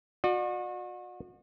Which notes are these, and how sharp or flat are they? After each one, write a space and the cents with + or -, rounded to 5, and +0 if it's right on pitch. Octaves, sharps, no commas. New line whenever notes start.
F#4 -35 D5 +40